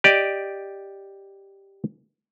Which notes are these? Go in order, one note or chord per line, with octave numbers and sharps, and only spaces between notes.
G4 D5 D#5